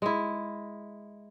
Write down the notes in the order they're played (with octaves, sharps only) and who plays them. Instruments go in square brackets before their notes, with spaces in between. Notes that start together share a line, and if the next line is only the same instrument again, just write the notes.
[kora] G#3 E4